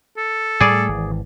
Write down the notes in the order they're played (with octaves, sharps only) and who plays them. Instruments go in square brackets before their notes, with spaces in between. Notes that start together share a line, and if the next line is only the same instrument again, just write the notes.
[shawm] A4
[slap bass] A2 G3 A3 [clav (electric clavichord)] G#4 D5
[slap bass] G#1 E3